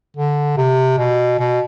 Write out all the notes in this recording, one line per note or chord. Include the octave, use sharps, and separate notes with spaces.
D3
C3
B2
B2